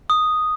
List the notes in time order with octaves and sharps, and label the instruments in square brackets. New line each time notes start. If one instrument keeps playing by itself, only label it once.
[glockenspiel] D#6